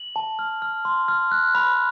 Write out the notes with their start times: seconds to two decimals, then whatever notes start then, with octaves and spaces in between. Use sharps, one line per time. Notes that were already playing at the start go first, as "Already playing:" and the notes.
Already playing: F#7
0.16 A5
0.39 F6
0.62 F6
0.85 C6
1.08 F6
1.31 F#6
1.55 B5